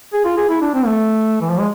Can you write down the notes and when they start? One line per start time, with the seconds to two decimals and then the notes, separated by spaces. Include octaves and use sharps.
0.13 G#4
0.25 F4
0.37 G#4
0.49 E4
0.61 D4
0.74 C4
0.86 A3
1.41 E3
1.50 F3
1.59 G#3